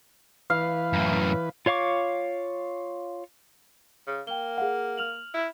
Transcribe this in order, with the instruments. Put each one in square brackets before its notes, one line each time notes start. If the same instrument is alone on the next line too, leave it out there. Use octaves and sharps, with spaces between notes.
[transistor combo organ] E3 B4 [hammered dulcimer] F5
[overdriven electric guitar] F#2 A2
[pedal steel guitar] F4 C#5 F5 C#6 D6
[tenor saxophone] C#3
[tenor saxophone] A#3 [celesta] G5 G7
[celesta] G#4 F5 F#5
F6 F7 F#7
[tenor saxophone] E4